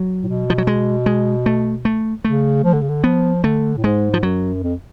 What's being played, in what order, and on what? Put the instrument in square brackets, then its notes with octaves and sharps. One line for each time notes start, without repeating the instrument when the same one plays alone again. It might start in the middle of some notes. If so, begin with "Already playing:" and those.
Already playing: [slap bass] F#3
[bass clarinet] A2
B2
[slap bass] F3
F#3
G#3
G#3
A3
A3
[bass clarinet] C#3 [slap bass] A3
[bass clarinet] F3
D3
C#3
D3
[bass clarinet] F3 [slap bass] B3
[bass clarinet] D3 [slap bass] A3
[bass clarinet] A2
[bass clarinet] G#2 [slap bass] G#3
[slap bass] F3
[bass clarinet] F#2 [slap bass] F#3
[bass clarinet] F2